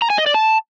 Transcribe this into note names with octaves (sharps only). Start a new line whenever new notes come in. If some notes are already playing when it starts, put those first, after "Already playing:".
A#5
G#5
D#5
D5
A5